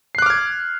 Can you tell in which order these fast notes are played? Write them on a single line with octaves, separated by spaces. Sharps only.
C7 F#6 D6 F6 G#6